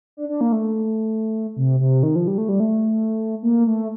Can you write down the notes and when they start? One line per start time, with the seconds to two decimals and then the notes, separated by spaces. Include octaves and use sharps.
0.17 D4
0.29 D4
0.41 A#3
0.52 A3
1.57 C3
1.80 C3
2.03 D#3
2.16 F3
2.28 G3
2.38 A3
2.49 G3
2.60 A3
3.43 A#3
3.67 A3